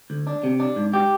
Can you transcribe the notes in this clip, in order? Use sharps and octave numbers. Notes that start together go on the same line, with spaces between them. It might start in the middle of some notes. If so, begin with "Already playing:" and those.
D2
D4
C3
D4
G#2
G4